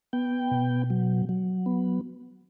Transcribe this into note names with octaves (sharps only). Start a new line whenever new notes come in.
B3 G5
B2
F#3
F#3
B3